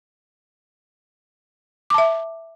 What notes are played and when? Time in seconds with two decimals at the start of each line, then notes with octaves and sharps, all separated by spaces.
1.90 D6
1.94 A5
1.98 E5